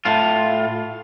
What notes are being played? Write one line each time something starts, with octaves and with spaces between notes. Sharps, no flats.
A2 F4